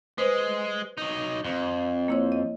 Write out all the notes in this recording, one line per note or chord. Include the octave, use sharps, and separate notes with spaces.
G#3 B4 C5
F#3 D#4
F2
A#3 E4 C#5
D#5